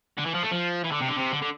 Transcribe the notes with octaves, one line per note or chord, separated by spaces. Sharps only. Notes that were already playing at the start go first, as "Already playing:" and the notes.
D3
E3
F3
A3
F3
E3
D3
C3
D3
C3
D3
D3